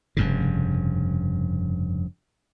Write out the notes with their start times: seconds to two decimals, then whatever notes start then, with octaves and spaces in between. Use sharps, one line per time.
0.17 F1 G2 C#3